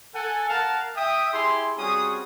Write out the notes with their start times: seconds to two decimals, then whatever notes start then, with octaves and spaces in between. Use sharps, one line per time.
0.15 A4 F#5 G#5
0.49 A#4 F5 F#5 A5
0.96 E5 G5 D#6
1.33 E4 G4 G#4 C6
1.78 G3 C4 C#4 F#4 G#4 D#6